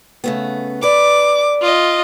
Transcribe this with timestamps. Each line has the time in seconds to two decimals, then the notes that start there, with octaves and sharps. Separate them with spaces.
0.24 C#3 A3 B3
0.83 B4 D5 D6
1.62 F4 D#5